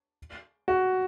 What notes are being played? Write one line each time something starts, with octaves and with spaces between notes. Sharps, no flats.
F#4